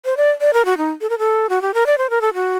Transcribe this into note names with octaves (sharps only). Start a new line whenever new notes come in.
C5
D5
D5
A#4
F#4
D#4
A4
A#4
A4
F#4
G4
A#4
D5
C5
A#4
A4
F#4